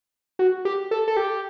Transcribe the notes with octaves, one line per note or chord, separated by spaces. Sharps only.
F#4
G4
A4
A4
G4